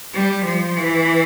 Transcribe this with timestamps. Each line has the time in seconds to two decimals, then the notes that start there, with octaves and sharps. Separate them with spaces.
0.14 G3
0.45 F3
0.77 E3